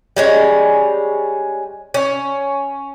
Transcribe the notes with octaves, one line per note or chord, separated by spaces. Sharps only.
G3 G#3 C#4
C#4